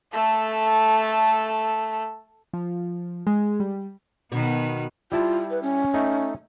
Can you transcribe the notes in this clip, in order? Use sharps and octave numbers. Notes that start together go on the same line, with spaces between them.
A3 A4
F3
G#3
G3
B2 D#3 B3
G3 E4 F4 A5
B4
C#4
A3 D#4